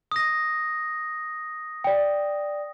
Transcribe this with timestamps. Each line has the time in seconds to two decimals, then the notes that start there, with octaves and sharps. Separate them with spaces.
0.12 D#6 A#6
1.84 D5 G5